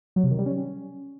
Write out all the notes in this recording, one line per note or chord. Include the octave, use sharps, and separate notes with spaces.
F#3
C3
D#3
G3
C#4